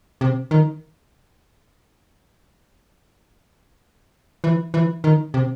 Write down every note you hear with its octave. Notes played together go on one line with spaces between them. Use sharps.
C3
D#3
E3
E3
D#3
C3